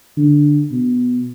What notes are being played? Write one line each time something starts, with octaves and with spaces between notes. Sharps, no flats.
D3
B2